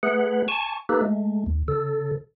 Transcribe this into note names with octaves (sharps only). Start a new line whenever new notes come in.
A3 G#4 B4 F#5
G#5 A5 C#6
A#3 D#4 G4 A4 B4
G#3 A3
D#2
C#3 A4